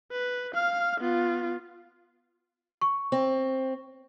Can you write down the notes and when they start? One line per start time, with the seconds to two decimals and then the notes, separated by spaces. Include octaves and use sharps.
0.12 B4
0.55 F5 F6
1.00 B3 F4
2.82 C#6
3.12 C4